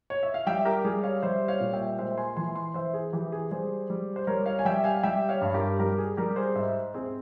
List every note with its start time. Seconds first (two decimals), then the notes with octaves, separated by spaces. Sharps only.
0.10 C#5
0.23 E5
0.34 F5
0.47 G3 E5 G5
0.65 G4 A#4
0.84 G3 G#4
1.03 C#5 F5
1.22 G3 C5 E5
1.48 C#5 F5
1.60 A#2
1.73 E5 G5
1.99 G#3 C5 E5
2.17 G#5 C6
2.36 E3 G#5 C6
2.56 G#5 C6
2.74 E3 C5 E5
2.94 G#4
3.13 E3 G4
3.32 G#4
3.51 G3 G#4 C5
3.90 G3
4.16 C5
4.27 G3 A#4 C#5
4.46 C#5 F5
4.59 G#5
4.65 G3 E5 G5
4.84 F5 G#5
5.03 G3 E5 G5
5.29 C#5 F5
5.41 G2
5.54 G4 A#4
5.79 G3 G4 A#4
5.98 G#4
6.17 G3 G4 A#4
6.36 G#4 C5
6.55 G#2 C5 E5
6.94 C4 G#4 C5